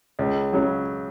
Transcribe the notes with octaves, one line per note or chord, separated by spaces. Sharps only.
C#2
C#3 F#3